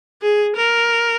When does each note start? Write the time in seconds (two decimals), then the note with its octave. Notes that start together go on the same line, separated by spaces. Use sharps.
0.22 G#4
0.56 A#4